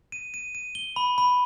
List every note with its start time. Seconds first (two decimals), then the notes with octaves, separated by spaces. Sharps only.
0.12 D#7
0.34 D#7
0.55 D#7
0.75 G7
0.96 B5
1.18 B5